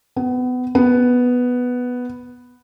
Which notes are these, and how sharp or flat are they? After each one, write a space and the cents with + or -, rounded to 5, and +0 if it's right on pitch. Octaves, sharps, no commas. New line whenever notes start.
B3 +25
B3 +0